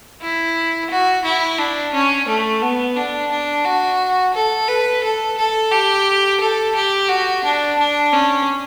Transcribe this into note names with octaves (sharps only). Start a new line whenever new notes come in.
E4
F#4
E4
D4
C#4
A3
B3
D4
D4
F#4
A4
B4
A4
A4
G4
A4
G4
F#4
D4
D4
C#4